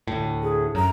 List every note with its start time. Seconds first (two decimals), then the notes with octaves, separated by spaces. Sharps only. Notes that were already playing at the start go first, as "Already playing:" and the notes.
0.07 D2 A2
0.43 G#4
0.75 F#2 A#5